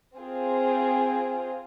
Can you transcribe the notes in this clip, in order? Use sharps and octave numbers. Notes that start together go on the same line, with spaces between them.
C4 F4 G#4